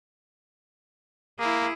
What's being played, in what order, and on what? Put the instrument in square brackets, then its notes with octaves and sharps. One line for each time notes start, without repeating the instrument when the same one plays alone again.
[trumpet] A#3 [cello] E4 G#4